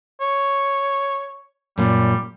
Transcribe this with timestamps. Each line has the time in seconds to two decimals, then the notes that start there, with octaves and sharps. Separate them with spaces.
0.20 C#5
1.78 F#2 A#2 G3